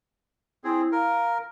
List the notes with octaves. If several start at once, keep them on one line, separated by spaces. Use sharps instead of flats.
C4 E4 G#4
A#4 F5